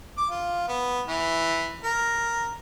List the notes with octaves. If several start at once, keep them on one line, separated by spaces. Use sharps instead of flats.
D6
F4
B3
E3
A#4